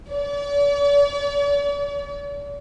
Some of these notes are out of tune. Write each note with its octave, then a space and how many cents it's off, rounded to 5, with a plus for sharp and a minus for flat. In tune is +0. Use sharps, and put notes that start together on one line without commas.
D5 -45